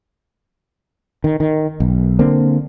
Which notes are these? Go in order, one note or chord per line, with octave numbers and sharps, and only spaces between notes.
D#3
D#3
B1
D3 A#3 C4